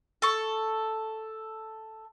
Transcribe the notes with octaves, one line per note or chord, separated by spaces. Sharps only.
A4 C#6